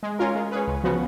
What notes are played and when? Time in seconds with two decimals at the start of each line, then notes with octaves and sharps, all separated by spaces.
0.03 G#3
0.19 C#4 F4 A#4
0.35 G#3
0.51 C#4 G#4 B4
0.67 C#2
0.84 C#3 F3 B3 F#4